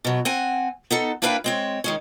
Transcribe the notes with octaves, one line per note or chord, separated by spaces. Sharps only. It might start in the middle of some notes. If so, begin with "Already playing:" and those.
B2 F#3
C4 F#5 G#5
B3 D#4 A4
A#3 D4 E4 B4 F5 G5
G#3 C4 C#5
D#3 G#3 C#4